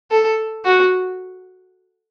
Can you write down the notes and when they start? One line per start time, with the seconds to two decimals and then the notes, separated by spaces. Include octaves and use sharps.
0.11 A4
0.65 F#4